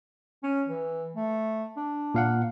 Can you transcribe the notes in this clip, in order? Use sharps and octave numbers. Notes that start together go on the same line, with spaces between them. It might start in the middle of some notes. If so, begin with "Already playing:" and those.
C#4
E3
A3
D4
A#2 F5 F#5